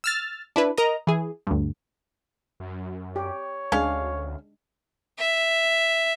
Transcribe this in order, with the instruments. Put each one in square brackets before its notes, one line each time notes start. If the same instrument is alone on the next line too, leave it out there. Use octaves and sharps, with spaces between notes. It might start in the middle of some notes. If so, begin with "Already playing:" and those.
[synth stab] E6 F6 A6
D4 E4 B4
A#4 D#5 A#5
E3 G#4
D2 G2
[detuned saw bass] F#2
[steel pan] G4 [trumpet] C#5
[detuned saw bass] D2 [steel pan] G#3 D4 [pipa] C#4 F5
[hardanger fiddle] E5